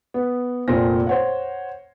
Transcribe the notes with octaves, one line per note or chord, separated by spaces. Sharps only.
B3
F1 A#2 C5 A#6
C5 C#5 F#5